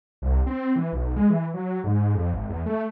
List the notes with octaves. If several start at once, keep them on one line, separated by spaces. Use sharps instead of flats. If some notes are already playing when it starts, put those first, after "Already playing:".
C2
C4
E3
B1
G#3
E3
F#3
G#2
F2
G#1
E2
A3